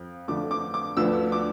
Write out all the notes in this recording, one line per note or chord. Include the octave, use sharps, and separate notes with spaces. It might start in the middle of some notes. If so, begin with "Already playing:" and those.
Already playing: F2
F2 D3 A3 D6
D6
D6
D2 D3 F3 B3 D4 E6
D6